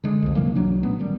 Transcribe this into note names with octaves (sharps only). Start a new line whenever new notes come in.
D3 G#3
C2 F2
C3 E3 F#3 A#3
B1 F#3 D4
A#2 A3 B3 C#4
A1 D#3 G3